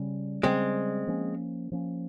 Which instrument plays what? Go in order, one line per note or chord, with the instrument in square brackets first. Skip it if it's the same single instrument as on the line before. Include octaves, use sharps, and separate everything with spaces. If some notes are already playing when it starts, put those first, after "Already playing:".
Already playing: [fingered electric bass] C#3 G3 C#4
[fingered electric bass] C#3 G3 C#4 [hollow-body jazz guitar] G#3 C4
[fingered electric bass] F3 A#3 C#4
F3 A#3 C#4